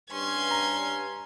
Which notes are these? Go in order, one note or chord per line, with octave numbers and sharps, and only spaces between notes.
G2 C#4 C6 G#6
A#5